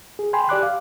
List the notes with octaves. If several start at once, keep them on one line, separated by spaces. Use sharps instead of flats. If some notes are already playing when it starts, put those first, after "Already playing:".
G#4
G5 G#5 B5 C6
G4 D5 D6 F#6
F5